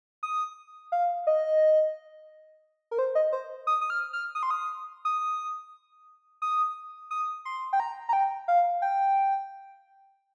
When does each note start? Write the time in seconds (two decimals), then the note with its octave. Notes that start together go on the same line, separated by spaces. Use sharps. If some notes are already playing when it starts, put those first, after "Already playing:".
0.23 D#6
0.92 F5
1.27 D#5
2.91 A#4
2.99 C5
3.15 D#5
3.33 C5
3.67 D#6
3.81 D#6
3.90 F6
4.13 F6
4.35 D#6
4.43 C6
4.51 D#6
5.05 D#6
6.42 D#6
7.11 D#6
7.45 C6
7.73 G5
7.80 A#5
8.09 A#5
8.13 G5
8.48 F5
8.82 G5